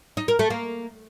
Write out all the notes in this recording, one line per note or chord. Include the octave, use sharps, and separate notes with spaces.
D#4
A#4
A3
A#3